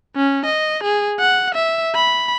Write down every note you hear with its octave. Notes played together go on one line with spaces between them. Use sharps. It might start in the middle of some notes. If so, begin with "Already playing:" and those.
C#4
D#5
G#4
F#5
E5
B5